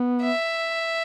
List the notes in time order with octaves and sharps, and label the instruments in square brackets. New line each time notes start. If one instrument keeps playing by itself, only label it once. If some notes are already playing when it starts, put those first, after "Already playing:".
Already playing: [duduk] B3
[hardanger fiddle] E5